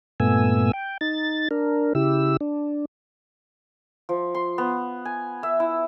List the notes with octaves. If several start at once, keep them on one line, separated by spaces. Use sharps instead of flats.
G2 A#2 A3 B3 G#5 E6
G5
D#4 A6
D4 A#4
C#3 E4 G4 E6
D4
F3
C6
B3
G#5
E5
E4